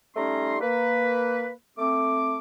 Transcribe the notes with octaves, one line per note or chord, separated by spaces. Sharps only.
G3 A3 C#4 D#4 A#5 C6
A#3 B4
A3 C4 D6